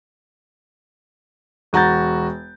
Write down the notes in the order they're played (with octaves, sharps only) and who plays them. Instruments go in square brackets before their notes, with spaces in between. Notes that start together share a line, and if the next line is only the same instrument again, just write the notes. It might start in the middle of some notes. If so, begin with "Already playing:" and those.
[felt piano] E1 F#4 A#5 G6 A6